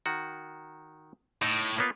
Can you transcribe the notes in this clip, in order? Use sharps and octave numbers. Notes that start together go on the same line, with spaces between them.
D#3 F#4
A2 D#4
A#3 B3 F4